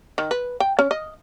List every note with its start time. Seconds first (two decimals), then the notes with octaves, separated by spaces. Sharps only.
0.18 D#3
0.31 B4
0.60 G5
0.79 C#4
0.91 D#5